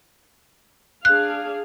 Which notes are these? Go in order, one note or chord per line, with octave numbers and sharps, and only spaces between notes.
D4 G#4 F5 F#6